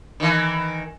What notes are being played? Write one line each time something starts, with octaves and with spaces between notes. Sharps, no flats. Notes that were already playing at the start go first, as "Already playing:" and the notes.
D#3 E3